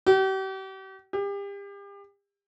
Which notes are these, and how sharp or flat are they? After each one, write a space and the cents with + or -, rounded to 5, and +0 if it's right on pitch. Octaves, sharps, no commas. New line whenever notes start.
G4 -40
G4 +35